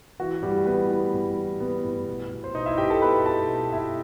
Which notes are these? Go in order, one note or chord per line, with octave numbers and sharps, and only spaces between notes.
E3 F#4
A2 G3 G4
E3 B3 B4
A2 B3 B4
A2
E3
A2 B3 B4
A2
B2
B2
C5
B2 D#4 D#5
E4 E5
B2 G4 G5
A4 A5
B2 B4 B5
B2 A4 A5
B2
B2 E4 E5